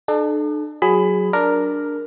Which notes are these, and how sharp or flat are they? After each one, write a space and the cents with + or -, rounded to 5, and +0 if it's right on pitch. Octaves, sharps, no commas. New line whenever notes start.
D4 +40 A4 -30
F#3 +0 G#4 +0 B5 +20
D4 +0 A#4 +0